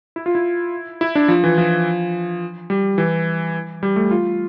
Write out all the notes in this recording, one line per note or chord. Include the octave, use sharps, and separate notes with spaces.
E4
F4
E4
E4
D4
F3
E3
F3
G3
E3
G3
A3
F4